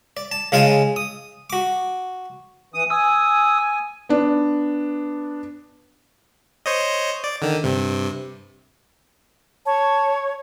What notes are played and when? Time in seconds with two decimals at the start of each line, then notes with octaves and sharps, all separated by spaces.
0.17 D5
0.32 A5
0.52 C#3 G#3 F4 F5 G#5 A5
0.96 D#6
1.50 F#4 D6
2.74 E3 D#6
2.90 G#5 D#6 E6
4.09 B3 D4
6.66 C5 C#5 D#5
7.24 D5
7.42 D3 D#3
7.64 G2 C3
9.66 C#5 A5